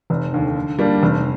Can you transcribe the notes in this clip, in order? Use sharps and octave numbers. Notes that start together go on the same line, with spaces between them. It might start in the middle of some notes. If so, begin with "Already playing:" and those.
F1
D#2 D3
D3
G3 A#3 D4
F1